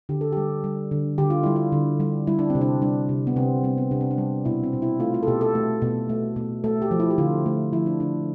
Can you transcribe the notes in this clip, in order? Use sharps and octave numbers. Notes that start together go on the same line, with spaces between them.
D3 G4
A4
G3 G4
G3
D3
D3 G4
F4
G3 E4
F4
D3
G3
G3 E4
D4
C4
C3
D4
G3 D4
C3
B3
C3 C4
G3 C4
B3
C3 D4
C4
D4
G3
B2 E4
C4
B2
E4
A3 F4
F4
A4
B2 G4
A4
A3
B2
A3
B2
A3 A4
G4
F3
E4
G4
D3 F4
A3
F3 E4
D4
D3 D4